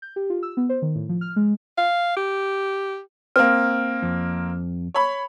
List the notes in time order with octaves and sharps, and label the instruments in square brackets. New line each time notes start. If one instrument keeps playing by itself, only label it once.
[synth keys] G6
G4
F4
E6
B3
C5
D#3
A2
F3
F6
G#3
[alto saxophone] F5
G4
[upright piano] A#3 C4 [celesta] F6
[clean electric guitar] F2
[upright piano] C#5 B5